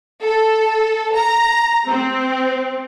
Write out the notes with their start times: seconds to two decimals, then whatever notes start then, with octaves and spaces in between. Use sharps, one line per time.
0.24 A4
1.14 A#5
1.89 C4